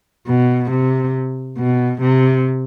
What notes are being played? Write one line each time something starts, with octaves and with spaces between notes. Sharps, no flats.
B2
C3
B2
C3